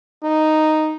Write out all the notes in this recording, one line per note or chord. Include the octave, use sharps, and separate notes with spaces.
D#4